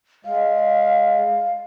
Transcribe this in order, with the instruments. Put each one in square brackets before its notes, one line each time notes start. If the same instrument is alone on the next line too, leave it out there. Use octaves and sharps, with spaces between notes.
[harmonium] G#3 [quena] F5